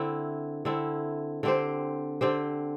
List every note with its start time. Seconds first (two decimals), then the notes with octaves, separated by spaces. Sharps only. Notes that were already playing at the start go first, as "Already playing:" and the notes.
Already playing: D3 C4 E4
0.65 D3 C4 E4
1.43 D3 C4 G4 C5
2.21 D3 C4 G4 C5